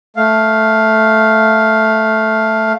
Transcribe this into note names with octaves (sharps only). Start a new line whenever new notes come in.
A3 F5